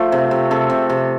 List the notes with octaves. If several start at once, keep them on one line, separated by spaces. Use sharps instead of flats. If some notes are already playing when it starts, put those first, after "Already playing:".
Already playing: F3 A3
C3
C3
C3 A4
C3
C3